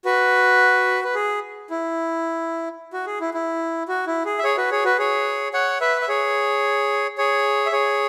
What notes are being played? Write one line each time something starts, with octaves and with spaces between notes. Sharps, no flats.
F#4 B4
B4
G#4
E4
F#4
G#4
E4
E4
F#4
E4
G#4
E5
G#4 C#5
F#4 B4
G#4 C#5
F#4 B4
G#4 C#5
C#5 F#5
B4 E5
E5
G#4 C#5
G#4 C#5
E5
G#4 C#5